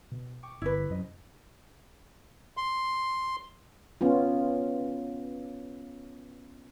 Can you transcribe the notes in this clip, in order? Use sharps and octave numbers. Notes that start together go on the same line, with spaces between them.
B2
G5 C#6 D6
G1 E4 B4
B6
F#2 C3 C5 D#5
C6
B3 C#4 F4